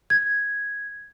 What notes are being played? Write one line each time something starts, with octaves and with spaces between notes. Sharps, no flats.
G#6